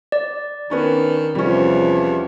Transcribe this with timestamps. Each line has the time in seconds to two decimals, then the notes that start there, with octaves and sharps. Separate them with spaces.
0.12 D5
0.70 D#3 B3 C#4 D4
1.35 E2 C3 F3 G3 C#4